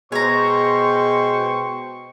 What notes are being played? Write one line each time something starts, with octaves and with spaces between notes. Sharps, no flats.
B2 G#3 C5 C#5 G5 A#5 C#6